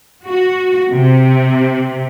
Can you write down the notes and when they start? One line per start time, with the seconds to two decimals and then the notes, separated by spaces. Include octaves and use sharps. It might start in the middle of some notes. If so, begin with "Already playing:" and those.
0.24 F#4
0.90 C3